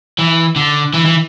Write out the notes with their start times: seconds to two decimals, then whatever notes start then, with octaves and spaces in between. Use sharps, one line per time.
0.18 E3
0.56 D3
0.94 E3
1.06 E3